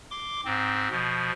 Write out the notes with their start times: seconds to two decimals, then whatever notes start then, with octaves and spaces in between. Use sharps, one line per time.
0.11 C6 D6
0.45 G#2 C4
0.90 B2 F3